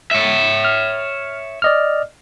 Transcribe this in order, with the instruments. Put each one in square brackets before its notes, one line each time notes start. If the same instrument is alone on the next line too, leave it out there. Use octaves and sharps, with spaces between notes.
[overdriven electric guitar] C#5 E5
[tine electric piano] F6
D5 D#5 F6